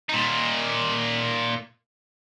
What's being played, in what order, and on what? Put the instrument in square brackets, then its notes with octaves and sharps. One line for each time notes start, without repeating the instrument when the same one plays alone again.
[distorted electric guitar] A#2 D#4